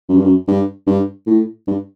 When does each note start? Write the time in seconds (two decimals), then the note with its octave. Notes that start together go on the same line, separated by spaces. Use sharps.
0.09 F#2
0.17 G2
0.24 F#2
0.48 G2
0.87 G2
1.27 A2
1.67 G2